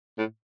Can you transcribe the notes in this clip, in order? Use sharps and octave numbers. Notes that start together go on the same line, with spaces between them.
A2